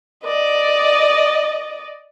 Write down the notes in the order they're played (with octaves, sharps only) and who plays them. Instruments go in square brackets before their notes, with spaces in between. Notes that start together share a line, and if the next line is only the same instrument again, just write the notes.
[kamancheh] D5 D#5